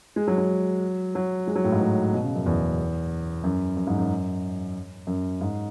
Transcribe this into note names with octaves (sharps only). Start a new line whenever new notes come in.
G#3
F#3
F#3
F#3
G#3
F#3
A2
G#2
A2
B2
C#3
F#2
E2
F#2
F#2
G#2
F#2
F#2
G#2